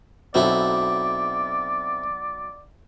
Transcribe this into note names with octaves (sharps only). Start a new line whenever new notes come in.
B1 B2 F#3 C4 E4 A4 D5